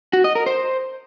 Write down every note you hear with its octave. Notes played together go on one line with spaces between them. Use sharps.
F#4
D#5
A#4
C5